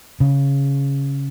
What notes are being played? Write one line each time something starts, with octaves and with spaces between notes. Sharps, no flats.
C#3